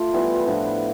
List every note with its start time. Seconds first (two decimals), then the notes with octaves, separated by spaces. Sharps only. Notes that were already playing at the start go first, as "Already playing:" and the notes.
Already playing: A3 F4
0.13 E3 G3 B3
0.46 A2 F3 B3 D4